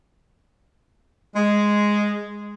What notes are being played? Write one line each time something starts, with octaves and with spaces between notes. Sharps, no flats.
G#3